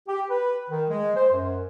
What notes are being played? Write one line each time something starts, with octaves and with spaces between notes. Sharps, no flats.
G4
B4
D#3
G#3
C5
F#2